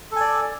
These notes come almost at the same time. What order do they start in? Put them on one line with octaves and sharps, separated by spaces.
A4 G#5 D5